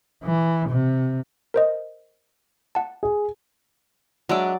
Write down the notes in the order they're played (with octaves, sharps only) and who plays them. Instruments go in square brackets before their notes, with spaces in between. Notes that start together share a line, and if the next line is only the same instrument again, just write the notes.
[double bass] E3
C3
[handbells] A#4 C5 D#5
F#5 A5
[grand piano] G#4
[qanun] F#3 D5 [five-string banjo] G#3 D4 E5